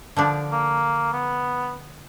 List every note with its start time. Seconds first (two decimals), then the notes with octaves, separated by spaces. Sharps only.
0.17 D3 F3 D4
0.52 A#3
1.13 B3